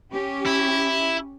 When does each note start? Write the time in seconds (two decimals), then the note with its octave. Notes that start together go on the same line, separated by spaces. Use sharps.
0.12 C#4 G4
0.46 E4